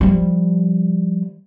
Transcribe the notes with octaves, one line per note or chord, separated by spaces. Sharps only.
F3 G3